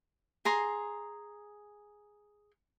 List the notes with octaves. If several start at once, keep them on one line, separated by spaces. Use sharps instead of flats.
G#4 A#5 C6